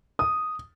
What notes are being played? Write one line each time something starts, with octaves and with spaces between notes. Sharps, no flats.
D#6